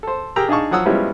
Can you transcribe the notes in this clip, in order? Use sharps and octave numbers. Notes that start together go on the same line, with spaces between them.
A4 C5
G4 G#4 A#4 G5 A#5 E6
D4 D#4 G#4 F5 A5 C#6
F3 F#3 F#5 D#6 E6
F3 G3 G#3 B3 C#4 E4